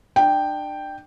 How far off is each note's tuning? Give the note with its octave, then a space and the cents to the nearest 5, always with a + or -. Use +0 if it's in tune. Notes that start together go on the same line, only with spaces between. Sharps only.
D4 +35 G5 +0